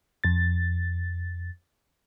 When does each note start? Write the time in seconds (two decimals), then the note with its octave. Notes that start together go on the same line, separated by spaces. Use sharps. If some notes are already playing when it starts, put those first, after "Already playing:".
0.24 F2 A6